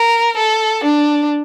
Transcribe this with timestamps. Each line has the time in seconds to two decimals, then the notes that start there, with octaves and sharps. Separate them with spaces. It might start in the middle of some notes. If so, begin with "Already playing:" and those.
Already playing: A#4
0.36 A4
0.84 D4